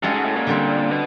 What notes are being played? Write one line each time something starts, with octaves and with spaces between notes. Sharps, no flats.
G2 G#3 C#4 F#4 A4
G#2
A2
A#2
D3 G3 C4
B2